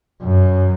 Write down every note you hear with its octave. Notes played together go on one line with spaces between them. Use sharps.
F#2